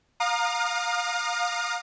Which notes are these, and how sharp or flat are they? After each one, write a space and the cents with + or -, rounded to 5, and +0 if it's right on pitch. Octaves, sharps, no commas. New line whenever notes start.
F5 +25 A#5 +0 D#6 -35